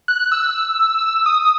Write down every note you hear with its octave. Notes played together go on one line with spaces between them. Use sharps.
F#6
E6
D#6